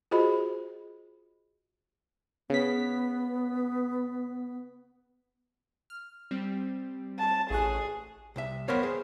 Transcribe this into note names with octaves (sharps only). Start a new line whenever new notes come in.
F4 F#4 G#4 C5 D#5 B5
C#3 B3 B6
F6
G3 C4
A5
A1 G#4 C#6 F#6
C2 E5
B3 G4 A#4 C5 C#5 F5
G#4 C5